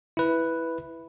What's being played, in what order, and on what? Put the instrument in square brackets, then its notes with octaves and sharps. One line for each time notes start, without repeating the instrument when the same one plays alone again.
[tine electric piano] E4 B4